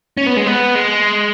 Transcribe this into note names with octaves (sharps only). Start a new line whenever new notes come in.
C#4
B3
G#3
B3
G#3